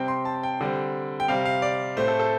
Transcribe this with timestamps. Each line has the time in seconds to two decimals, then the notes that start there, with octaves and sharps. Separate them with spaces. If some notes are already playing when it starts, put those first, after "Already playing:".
Already playing: C3 G3 C4 G5
0.08 C6
0.25 A5
0.43 G5
0.61 D3 G3 C4
1.20 G5
1.28 C3 G3 C4 F5
1.45 F5
1.62 D5
1.97 A2 A3 C4 C5
2.08 A4
2.19 A4